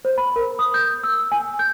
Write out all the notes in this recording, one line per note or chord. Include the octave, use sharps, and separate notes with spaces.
C5
B5
A#4
D#6
G6
E6
G#5
G6